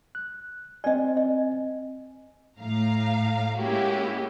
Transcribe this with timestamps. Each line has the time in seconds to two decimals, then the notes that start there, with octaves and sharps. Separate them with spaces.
0.15 F#6
0.84 C4 D5 D#5 G#5
1.17 D#5
2.59 A2 F5 A#5
3.57 G#3 A#3 C#4 E4 F#4 G4